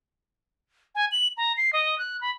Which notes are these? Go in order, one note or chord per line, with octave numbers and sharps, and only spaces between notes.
G#5
F#7
A#5
C7
D#5
F#6
B5